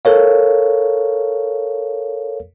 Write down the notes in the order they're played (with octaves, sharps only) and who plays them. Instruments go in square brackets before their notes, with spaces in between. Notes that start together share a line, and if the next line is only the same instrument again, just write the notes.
[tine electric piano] A4 A#4 C#5 F5